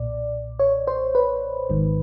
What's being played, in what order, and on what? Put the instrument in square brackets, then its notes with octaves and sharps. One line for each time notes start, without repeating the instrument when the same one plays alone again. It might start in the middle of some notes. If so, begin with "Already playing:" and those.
Already playing: [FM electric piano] B1 A#2 D5
C#5
C5
B4
G#1 G#2 D#3